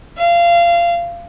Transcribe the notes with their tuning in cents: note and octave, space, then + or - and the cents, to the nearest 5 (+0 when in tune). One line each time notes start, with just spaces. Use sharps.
F5 -25